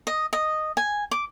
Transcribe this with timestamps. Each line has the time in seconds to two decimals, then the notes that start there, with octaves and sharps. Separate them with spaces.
0.07 D#5
0.33 D#5
0.77 G#5
1.11 D6